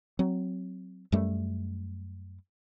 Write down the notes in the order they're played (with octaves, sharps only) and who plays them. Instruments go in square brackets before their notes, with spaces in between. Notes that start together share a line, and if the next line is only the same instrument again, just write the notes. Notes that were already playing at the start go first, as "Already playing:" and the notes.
[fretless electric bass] F#3 C4
F#2 G3 A3